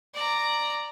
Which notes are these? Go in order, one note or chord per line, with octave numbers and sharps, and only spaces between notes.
D5 A#5